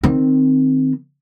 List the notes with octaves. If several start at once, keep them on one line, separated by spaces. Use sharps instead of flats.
D#3 C4